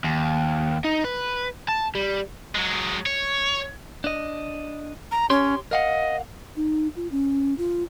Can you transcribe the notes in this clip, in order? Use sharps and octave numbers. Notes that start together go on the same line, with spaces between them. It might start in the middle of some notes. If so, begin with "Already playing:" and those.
D#2
D#4
B4
A5
G3
F#3 G#3
C#5
D4 D#5
A#5
C#4 G4 C#5 C6
A#4 D#5 F5 F#5
D#4
F4
C#4
F4